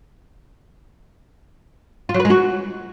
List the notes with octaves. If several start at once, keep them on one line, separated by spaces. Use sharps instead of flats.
F4
F#3
B4
G#3
F#4